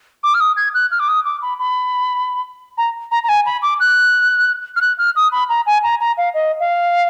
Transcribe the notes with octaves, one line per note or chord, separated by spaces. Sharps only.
D6
F6
D#6
G#6
F#6
F6
D6
D#6
D6
B5
B5
A#5
A#5
A#5
G#5
B5
D6
F#6
F6
F#6
F6
D#6
B5
A#5
G#5
A#5
A#5
F5
D#5
F5